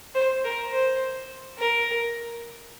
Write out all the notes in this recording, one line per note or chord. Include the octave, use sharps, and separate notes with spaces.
C5
A#4
C5
A#4